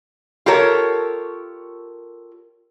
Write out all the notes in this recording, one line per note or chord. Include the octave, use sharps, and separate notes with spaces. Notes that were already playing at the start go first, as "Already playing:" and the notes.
F4 G4 A4 A#4 C#5